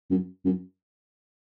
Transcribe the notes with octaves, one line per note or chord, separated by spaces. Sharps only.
F#2
F#2